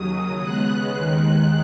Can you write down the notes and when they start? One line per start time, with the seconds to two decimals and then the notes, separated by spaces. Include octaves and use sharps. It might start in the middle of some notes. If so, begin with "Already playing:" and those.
Already playing: D#2 C#3 F#3 D#6
0.43 C#3 G#3 B3 F#6
0.96 D#2 D#3 G#3